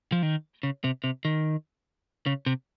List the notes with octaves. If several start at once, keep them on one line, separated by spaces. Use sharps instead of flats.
F3
D#3
C#3
C3
C3
D#3
C#3
C3